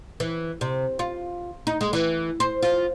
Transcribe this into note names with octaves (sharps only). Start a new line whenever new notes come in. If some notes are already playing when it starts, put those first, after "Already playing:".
E3
C3
F4
D#4
G#3
E3
C5
F4